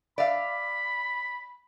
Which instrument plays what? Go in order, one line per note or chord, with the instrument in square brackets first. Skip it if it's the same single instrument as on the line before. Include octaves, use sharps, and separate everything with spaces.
[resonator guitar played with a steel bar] D5 E5 F5 [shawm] B5